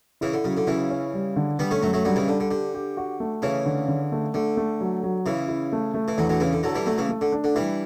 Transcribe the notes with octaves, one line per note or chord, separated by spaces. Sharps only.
C#3 E3 E4
D3
C#3 F#3
D3
C#3 E3 E4
C#4
G3
D3
D3 G3 B3
A3 C#4
F#2 F#3 A3
F#3 A3
D3 F#3 G3
C#3 E3
D3 D4
D3
D3 G4
G4
F#4
A3
C#3 E3 C#4
D3
D3
A3
D3 A3
A3
F#3
F#3
C#3 E3 E4
E4
A3
A3
E3
E2 D3 F#3
D3 F#3
C#3 E3 E4
D3
D3 F#3 A4
E3 G3
D3 F#3 A3
C#3 E3
A3
D3
D4
D3
E3 G3 E4